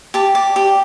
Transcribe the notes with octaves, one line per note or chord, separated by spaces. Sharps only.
G4 A5
D5
G4